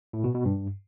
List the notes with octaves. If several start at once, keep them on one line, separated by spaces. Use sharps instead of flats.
A2
B2
B2
G2